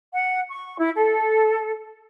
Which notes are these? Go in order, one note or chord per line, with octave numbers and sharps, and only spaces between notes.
F#5
C#6
E4
A4